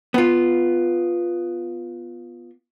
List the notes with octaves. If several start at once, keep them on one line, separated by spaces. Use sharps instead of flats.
B3 F4